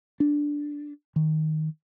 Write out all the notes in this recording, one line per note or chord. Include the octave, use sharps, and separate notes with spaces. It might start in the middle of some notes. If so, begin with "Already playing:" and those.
D4
D#3